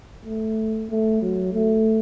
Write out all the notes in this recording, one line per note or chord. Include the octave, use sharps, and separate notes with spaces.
A3
A3
F#3
A3